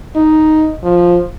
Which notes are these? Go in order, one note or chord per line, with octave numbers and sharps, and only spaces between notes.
D#4
F3